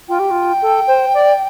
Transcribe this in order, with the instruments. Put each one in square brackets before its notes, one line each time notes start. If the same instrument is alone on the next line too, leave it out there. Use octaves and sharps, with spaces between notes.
[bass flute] F4 [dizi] G5
[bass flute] G4
F4
A4
C5
D5